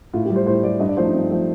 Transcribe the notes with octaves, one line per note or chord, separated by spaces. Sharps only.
A2 F4
G4
G3
C5
A2 C5
G3 D5
G2 D#5
D5
F3 A3 C5
D#4
G2 C4
F3 A3